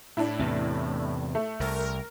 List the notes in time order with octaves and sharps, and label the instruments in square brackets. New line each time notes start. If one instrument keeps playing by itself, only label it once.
[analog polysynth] A2 [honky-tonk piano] D4 E4
[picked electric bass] E2 C3
[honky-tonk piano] A3
[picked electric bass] C2 [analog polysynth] A#4